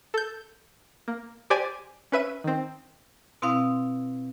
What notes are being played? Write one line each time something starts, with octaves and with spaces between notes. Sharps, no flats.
A4 G6
A#3
G4 C5 D5 G5 G#5
C#4 B4 E5 D#7
D#3 C4
B2 C4 E4 F5 D#6